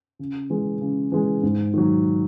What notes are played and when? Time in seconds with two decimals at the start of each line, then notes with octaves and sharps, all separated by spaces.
0.19 C#3
0.50 E3 G#3
0.81 C#3
1.12 E3 G#3
1.43 G#2
1.74 D#3 F#3